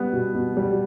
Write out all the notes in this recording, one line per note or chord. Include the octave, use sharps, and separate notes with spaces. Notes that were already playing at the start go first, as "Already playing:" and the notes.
Already playing: G3 B3
B2
B2
G3